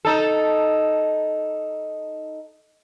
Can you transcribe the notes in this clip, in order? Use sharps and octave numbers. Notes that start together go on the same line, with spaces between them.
D#4 A4